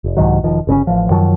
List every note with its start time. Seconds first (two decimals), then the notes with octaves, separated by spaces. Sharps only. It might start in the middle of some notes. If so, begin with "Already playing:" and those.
0.04 F1
0.17 C2 G#2 D#3 F#3
0.44 E1 D#3 F3
0.67 G1 C#3 C4 C#4
0.87 A1 F3
1.10 F#2 D#3 F3 F#3